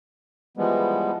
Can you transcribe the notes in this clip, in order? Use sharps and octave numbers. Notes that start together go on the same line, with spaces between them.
E3 F3 G3 G#3 B3